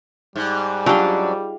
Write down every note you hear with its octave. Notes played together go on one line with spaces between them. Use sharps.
G#2 G3
F#3 C#4 D4 F4 G4